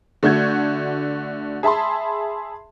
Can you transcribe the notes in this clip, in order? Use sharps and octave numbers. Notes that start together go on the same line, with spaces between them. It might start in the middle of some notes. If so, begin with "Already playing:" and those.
D3 A3 F#4 G6 G#6
G#4 E5 A5 B5 C6